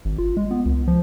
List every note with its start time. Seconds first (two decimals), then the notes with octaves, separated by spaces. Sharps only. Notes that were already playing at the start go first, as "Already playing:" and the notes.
0.05 G#1
0.18 F4
0.37 G#3
0.51 B3
0.65 C#2
0.88 F3